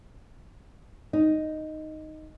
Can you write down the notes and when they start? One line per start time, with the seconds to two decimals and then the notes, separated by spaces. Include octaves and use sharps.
1.13 D#4